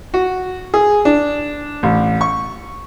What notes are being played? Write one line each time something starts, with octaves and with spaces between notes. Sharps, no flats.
F#4
G#4
D4
A1
C#6